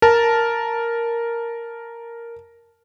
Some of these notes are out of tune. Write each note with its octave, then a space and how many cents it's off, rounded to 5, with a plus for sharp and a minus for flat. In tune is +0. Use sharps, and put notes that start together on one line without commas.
A#4 +0 A5 +0